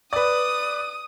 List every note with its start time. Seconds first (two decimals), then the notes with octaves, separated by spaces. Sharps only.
0.13 B4 D5 D#6